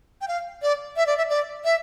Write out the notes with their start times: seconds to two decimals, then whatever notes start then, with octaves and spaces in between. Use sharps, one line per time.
0.21 G5
0.28 F5
0.62 D5
0.96 E5
1.06 D5
1.18 E5
1.30 D5
1.65 E5